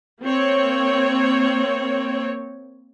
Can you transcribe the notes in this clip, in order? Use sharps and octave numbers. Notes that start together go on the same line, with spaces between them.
A#3 C4 C#5